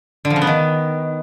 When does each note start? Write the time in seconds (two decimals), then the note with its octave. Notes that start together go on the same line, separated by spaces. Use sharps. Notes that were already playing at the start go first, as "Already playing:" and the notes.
0.25 D3
0.30 F3
0.36 C#3
0.42 B3
0.47 D#3